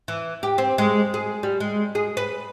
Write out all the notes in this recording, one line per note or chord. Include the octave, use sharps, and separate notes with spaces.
E3
G4
C4
G#3
G#4
G3
G#3
G#4
B4